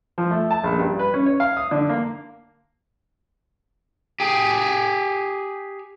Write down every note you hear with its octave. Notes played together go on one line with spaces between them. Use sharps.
F3
A3
A5
A#1
G2
B4
C#4
C#5
F5
D#6
D3
A#3
G4 G#4